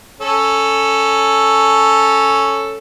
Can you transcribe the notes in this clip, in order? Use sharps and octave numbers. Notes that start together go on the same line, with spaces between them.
C#4 A4